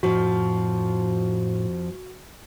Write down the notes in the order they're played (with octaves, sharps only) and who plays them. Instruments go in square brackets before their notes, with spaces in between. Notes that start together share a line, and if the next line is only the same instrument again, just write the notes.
[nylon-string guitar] F2 F3 [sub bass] A2 [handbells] F#4